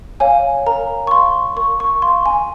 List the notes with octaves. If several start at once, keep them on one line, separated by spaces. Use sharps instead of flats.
C#5 F5 G#5
A#4 A#5
C#6
F5 C6
A#4 C#6
C#6
F5 C6
G#5